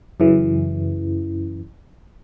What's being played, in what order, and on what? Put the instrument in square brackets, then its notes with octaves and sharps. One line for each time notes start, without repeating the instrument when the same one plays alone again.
[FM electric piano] F#2 C#3 E3